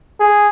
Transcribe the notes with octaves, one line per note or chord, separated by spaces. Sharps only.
G#4